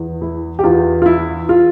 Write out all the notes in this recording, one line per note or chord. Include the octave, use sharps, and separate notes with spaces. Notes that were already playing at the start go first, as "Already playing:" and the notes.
Already playing: E2
E3 E4
G4
E2 F4
F4
E3 E4
F4